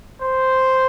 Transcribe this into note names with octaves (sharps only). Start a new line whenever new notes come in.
C5